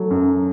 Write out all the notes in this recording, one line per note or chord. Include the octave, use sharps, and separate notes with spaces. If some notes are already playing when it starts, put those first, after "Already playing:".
Already playing: F#3 A3
F#2